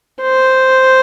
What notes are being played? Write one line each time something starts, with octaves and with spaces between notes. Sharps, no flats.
C5